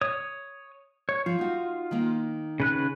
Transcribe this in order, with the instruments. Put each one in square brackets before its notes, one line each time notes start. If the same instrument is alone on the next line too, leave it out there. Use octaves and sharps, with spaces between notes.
[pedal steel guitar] C#5 D#6
C#5
[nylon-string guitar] F3 [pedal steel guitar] F4
[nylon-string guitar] D#4 F#4
D#3 A#3
[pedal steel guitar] C#3 B4 F#6